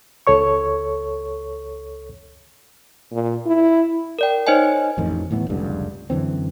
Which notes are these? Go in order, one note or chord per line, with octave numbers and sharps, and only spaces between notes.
C#2 A4 C#5 C#6
A#2
E4
A#4 D5 G5
D#4 C5 C#5 D#5 G#5
A1 F2 D#3
D1 A2 E3 B3
F1 C#2 G2 D3
F#2 D3 E3 C4